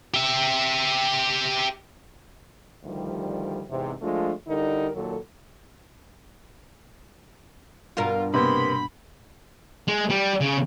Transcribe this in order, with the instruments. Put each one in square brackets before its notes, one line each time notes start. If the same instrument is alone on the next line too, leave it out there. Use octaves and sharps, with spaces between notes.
[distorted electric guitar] G4 E5
[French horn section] D2 D#3 F3 G3
E2 G#2 C3
F3 G#3 A3 D4 F4
D3 G3 D#4 E4 A#4
D#2 A#2 F#3 A4
[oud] G2 B2 A#4 [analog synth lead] F4
[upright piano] C3 A#3 B3 [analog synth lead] B5 [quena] C6
[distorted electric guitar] G#3
G3
C#3